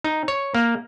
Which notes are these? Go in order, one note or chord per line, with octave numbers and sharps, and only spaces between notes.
D#4
C#5
A#3